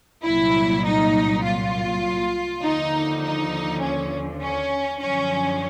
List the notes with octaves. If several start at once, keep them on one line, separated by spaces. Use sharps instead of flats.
C2 A#2 F#3 E4
D#4
F4
D#2 D3 F3 D#4
D#4
C#4
C#4
F#2 D3 F3 C#4